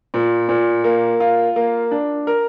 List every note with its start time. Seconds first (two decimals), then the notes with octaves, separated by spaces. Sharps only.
0.14 A#2
0.49 A#2
0.84 A#3
1.20 F4
1.56 A#3
1.91 D4
2.27 A#4